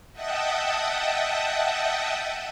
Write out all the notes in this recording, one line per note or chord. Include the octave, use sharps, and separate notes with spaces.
D#5 E5 F#5 G5 A5 D#6